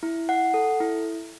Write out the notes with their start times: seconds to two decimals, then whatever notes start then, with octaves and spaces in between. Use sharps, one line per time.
0.03 E4
0.29 F#5
0.54 A4
0.80 E4